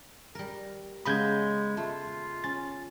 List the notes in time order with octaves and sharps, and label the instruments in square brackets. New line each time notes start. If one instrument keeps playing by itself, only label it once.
[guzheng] G3 A#4
[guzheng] C#3 B3 D#5 [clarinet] G#3 [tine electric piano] B5 G6 G#6
[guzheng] A3 [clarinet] F4
[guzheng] C#4 [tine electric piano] A6